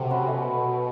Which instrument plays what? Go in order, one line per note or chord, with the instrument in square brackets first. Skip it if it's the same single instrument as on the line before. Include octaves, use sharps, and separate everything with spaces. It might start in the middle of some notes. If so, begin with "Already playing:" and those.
Already playing: [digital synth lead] C3 [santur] F#3 A3
[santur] C#4 F#4 B4
[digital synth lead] B2 [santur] A3